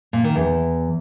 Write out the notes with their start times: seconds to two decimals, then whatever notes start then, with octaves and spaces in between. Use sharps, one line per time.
0.13 A#2
0.24 D#3
0.35 E2